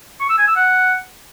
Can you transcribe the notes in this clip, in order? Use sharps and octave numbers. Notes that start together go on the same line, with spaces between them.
C#6
E6
G#5
E6
F#5